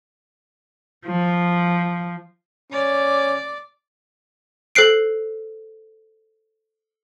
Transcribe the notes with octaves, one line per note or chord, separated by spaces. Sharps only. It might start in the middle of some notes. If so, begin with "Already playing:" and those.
F3
C#4 D5
A4 C5 F#6 C7 D7